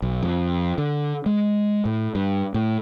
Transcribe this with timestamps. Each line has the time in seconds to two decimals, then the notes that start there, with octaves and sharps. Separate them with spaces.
0.02 B1
0.23 F2
0.78 D3
1.26 G#3
1.85 A2
2.15 G2
2.54 A2